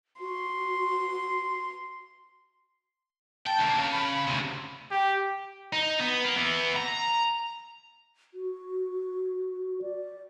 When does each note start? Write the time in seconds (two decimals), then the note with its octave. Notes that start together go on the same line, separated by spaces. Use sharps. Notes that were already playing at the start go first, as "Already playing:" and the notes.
0.20 F#4 C6
3.46 G5 A5
3.59 D2 A#3
3.78 C#3
3.91 B5
4.27 D2 C3
4.91 G4
5.73 D#4
6.00 B3
6.24 A#3
6.36 E3 B3
6.77 A#5
8.34 F#4
9.82 D5